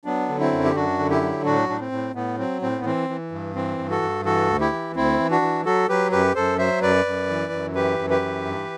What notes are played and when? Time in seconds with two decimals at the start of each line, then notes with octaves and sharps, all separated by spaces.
0.05 F#3 B3 D4
0.29 D3
0.40 C4 E4
0.52 F#2
0.64 G4
0.75 F#2 D4 F#4
0.99 D3
1.10 E4 G4
1.21 F#3
1.45 A2 D4 F#4
1.69 A2 D4
1.80 C4
1.92 A2
2.15 A2 B3
2.38 F#3 C4
2.62 A2 C4
2.78 B3
2.85 E3 C4
3.09 E3
3.32 G2
3.55 E3 C4
3.78 G2
3.90 F#4 A4
4.02 G2
4.25 E3 F#4 A4
4.49 D2
4.60 E4 G4
4.72 E3
4.95 D2 C4 E4
5.19 E3
5.31 D4 F#4
5.42 E3
5.65 F#3 F#4 A4
5.88 F#3 G4 B4
6.11 F#2 G4 B4
6.35 F#2 A4 C5
6.58 F#3 C5 E5
6.82 F#2 B4 D5
7.06 F#2
7.29 E3
7.52 F#2
7.75 E3 G4 B4
7.99 F#2
8.10 G4 B4
8.22 E3
8.45 G2